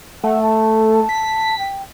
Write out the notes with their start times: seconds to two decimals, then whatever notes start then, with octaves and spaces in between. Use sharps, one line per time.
0.24 A3 F#5
0.43 A5
1.09 B6
1.59 G5